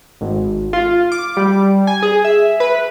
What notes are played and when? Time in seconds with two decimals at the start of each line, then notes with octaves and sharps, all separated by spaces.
0.21 G#1
0.73 F4
1.12 D6
1.37 G3
1.87 G#5
2.03 G#4
2.25 E5
2.60 B4